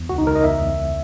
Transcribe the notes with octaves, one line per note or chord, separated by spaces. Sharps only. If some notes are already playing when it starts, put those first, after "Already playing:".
Already playing: E2
C#2 F#4
D#4
C#2 A#4
D#5
E2 E5
E2